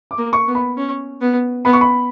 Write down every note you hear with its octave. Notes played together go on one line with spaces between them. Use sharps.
D6
A#3
C#6
B3
B5
C#4
B3
B3 B5
C#6
B5